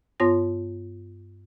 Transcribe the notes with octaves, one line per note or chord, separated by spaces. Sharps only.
G2 B3 F4 C#5 C6 A#6